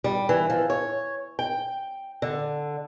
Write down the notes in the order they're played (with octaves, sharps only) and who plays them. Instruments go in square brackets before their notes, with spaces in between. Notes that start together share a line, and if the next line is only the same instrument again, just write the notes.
[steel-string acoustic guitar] G3
E3
F3
C#5
G5
D3